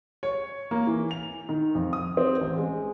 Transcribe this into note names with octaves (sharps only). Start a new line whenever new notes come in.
C#5
A#3
E3
F7
D#3
F2
D#6
C4
A1
G#3